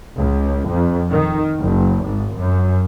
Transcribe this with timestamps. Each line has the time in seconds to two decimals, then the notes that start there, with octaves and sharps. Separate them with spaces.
0.16 C#2
0.67 F2
1.09 D#3
1.59 F#1
2.04 G#1
2.36 F#2